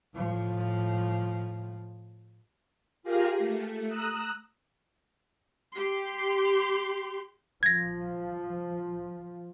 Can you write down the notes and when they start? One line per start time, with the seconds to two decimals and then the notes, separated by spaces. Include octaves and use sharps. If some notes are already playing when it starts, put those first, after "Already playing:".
0.15 A2 F3
3.03 F4 G4 G#4 A#4 F5 A#5
3.38 A3
3.88 A#5 D#6 E6 F#6
5.75 G4 C6
7.63 F3 G#6 A#6